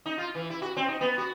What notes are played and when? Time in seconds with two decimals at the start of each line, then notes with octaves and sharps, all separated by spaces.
0.06 D#4
0.18 F4
0.35 E3
0.50 E4
0.62 F#4
0.77 C4
0.88 D#4
1.01 B3
1.18 F#4